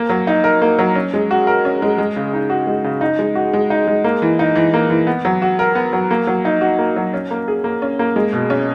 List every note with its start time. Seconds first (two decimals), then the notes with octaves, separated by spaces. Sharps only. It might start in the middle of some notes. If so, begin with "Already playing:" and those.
Already playing: A#3
0.10 F#3
0.27 D#4
0.44 A#4
0.62 A#3
0.79 F#3
0.95 C#4
1.14 G#3
1.31 F#4
1.47 A#4
1.65 C#4
1.82 G#3
1.98 G#3
2.16 C#3
2.33 D#4
2.50 F#4
2.67 G#3
2.84 C#3
3.01 D#4
3.19 G#3
3.35 F#4
3.53 G#3
3.70 D#4
3.87 G#3
4.04 A#3
4.22 E3
4.39 D#4
4.55 E3
4.74 A#3
4.90 E3
5.07 B3
5.25 F#3
5.42 F#4
5.59 A#4
5.75 B3
5.93 F#3
6.11 A#3
6.27 F#3
6.45 D#4
6.61 F#4
6.79 A#3
6.96 F#3
7.14 C#4
7.31 A#3
7.48 G#4
7.64 A#3
7.82 C#4
7.99 A#3
8.16 G#3
8.33 B2
8.50 C#4